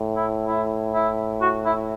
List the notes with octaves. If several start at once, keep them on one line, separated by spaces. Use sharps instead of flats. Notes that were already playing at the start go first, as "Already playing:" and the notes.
Already playing: A2
E4
E4
E4
F#4
E4